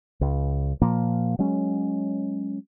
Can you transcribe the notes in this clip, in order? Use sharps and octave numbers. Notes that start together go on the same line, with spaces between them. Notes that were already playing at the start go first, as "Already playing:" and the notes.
C#2
A#2 F3 A#3
F#3 G#3 C#4